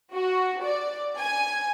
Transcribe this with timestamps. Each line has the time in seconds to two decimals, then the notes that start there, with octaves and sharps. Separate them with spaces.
0.13 F#4
0.64 D5
1.19 G#5